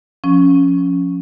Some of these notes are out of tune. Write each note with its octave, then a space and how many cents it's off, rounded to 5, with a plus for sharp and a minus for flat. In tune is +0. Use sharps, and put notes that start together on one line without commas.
F3 +20 C#4 +0